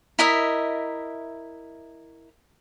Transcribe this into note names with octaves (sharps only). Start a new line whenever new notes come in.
E4 A#4 D#5 E5